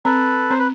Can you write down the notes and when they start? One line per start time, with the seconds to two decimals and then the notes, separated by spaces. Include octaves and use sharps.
0.05 C4 A4 B4
0.51 C4 C5
0.59 B4